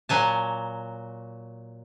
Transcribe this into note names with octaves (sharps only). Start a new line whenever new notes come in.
A#2 F#3 G#5 A5